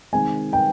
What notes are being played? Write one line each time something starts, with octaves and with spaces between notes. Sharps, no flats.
D#3 G#3 C4 G#5
G5